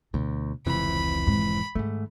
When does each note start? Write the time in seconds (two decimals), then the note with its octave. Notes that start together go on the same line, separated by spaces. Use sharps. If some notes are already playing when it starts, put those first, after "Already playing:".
0.14 D2 B2
0.66 F1 C#2 C3 E3 B5
1.27 G#2 D#3
1.75 G#2 D#3 A3